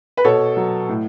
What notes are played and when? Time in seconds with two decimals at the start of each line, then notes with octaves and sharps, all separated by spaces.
0.17 B4
0.24 B2 A4 C#5
0.56 F#3
0.89 A2